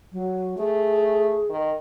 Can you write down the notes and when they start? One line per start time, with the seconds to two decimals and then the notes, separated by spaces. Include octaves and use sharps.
0.13 F#3
0.58 A3 G#4
1.49 D#3